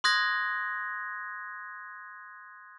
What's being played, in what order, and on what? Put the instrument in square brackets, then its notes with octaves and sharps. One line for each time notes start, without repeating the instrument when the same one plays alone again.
[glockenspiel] C6 D#6 F#6 G#6 A#6